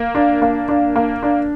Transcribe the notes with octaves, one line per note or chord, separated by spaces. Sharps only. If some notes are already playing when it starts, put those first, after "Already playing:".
Already playing: A#3
D4
A#3
D4
A#3
D4